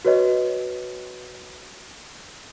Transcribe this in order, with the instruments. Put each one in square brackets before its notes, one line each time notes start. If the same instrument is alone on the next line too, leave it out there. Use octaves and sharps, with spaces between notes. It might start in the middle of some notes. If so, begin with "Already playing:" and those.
[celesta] F#4 B4 C#5 D#5